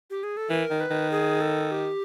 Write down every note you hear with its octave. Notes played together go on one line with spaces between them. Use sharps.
G4
G#4
A4
E3 A#4
D#3
B4
D#3
G#4
A4
G4